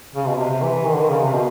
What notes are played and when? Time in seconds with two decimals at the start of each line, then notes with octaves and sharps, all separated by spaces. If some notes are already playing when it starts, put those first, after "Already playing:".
0.15 C#3
0.27 B2
0.38 C3
0.51 C3
0.62 E3
0.86 D#3
0.93 D3
1.01 D#3
1.09 C#3
1.23 C3
1.32 B2